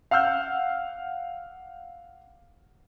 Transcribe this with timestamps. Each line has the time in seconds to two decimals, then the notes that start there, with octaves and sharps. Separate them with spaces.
0.11 F5 F#5 E6 F6 G6